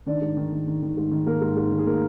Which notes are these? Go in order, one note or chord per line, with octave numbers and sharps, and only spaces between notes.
D#3 D4 D5
G#2
D#3
D#3
D#3
D#3
G#2
D#3
G#3 A#3 A#4
G#2
G#2
D#3
G#4
A#3 A#4